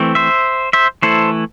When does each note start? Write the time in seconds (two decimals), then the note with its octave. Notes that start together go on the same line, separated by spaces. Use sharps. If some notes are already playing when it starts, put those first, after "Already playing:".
Already playing: E3 A3 C4
0.15 C5 E5
0.73 C5 E5
1.02 E3 A3 E4 A4 C5